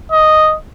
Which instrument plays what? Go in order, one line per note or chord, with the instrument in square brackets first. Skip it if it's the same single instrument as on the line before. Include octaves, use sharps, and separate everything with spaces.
[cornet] D#5